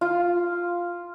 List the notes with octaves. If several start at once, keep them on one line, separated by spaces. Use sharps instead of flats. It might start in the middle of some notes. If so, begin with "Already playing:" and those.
F4